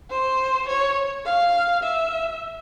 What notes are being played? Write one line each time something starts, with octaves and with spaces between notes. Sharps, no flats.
C5
C#5
F5
E5